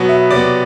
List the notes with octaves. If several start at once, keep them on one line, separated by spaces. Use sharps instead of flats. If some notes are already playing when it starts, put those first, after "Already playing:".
Already playing: B2 F#3 B3
E5
C3 F#3 B3 D5